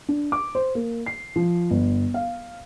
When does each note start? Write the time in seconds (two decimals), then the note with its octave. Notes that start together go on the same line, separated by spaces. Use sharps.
0.09 D4
0.32 D6
0.55 C5
0.75 A#3
1.06 C7
1.36 F3
1.71 G1
2.14 F5